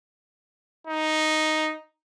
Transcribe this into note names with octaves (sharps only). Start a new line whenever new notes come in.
D#4